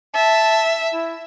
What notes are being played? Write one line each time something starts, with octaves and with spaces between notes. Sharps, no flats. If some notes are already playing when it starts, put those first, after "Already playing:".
E5 A5
E4